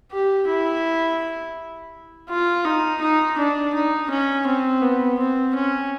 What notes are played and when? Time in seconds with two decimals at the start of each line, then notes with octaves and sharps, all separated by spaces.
0.12 G4
0.48 E4
2.29 F4
2.65 D#4
3.01 D#4
3.38 D4
3.74 D#4
4.10 C#4
4.46 C4
4.82 B3
5.19 C4
5.55 C#4